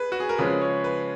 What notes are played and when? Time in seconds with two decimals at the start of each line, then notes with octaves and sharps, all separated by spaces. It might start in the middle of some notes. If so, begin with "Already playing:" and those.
Already playing: G#4 B4
0.12 F#4
0.20 G#4
0.29 A#4
0.38 C#3 F3 G#3 B4
0.61 C#5
0.84 B4